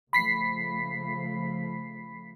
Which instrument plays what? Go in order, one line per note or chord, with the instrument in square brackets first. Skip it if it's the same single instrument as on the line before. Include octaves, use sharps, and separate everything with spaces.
[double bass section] C#3 F3 A3 [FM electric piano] B5 B6 C7